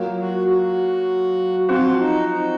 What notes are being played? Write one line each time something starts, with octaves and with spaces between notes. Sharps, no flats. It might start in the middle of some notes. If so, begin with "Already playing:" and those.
Already playing: F#3 A#3 F4
F#4
F#4
F3 C4 F4 F#4 C5
D#4
D#4